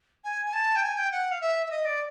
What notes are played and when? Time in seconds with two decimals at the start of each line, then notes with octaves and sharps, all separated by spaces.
0.24 G#5
0.46 G#5
0.53 A5
0.76 G5
0.82 G#5
0.97 G5
1.12 F#5
1.31 F5
1.41 E5
1.66 E5
1.70 D#5
1.85 D5